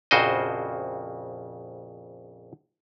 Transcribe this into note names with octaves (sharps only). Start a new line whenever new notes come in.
A#1 F2 C#3 F#4 C5 D#5